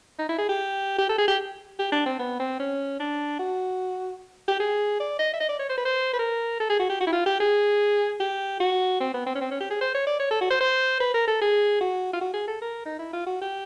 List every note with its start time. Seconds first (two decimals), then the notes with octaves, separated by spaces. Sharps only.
0.19 D#4
0.29 E4
0.39 G#4
0.49 G4
0.99 G4
1.09 A4
1.18 G#4
1.28 G4
1.79 G4
1.92 D4
2.06 C4
2.19 B3
2.40 C4
2.59 C#4
3.00 D4
3.39 F#4
4.48 G4
4.60 G#4
5.00 D5
5.19 D#5
5.34 E5
5.40 D#5
5.49 D5
5.59 C#5
5.69 C5
5.77 B4
5.85 C5
6.13 B4
6.19 A#4
6.60 A4
6.70 G#4
6.79 F#4
6.89 G4
7.00 F#4
7.07 E4
7.13 F4
7.26 G4
7.40 G#4
8.20 G4
8.60 F#4
9.00 C4
9.14 B3
9.26 C4
9.35 C#4
9.41 C4
9.51 C#4
9.61 G4
9.70 G#4
9.81 C5
9.94 C#5
10.07 D5
10.20 C#5
10.31 A4
10.41 F#4
10.51 C5
10.61 C5
11.00 B4
11.14 A#4
11.28 A4
11.41 G#4
11.81 F#4
12.13 F4
12.21 F#4
12.34 G#4
12.48 A4
12.62 A#4
12.86 D#4
12.99 E4
13.13 F4
13.27 F#4
13.41 G4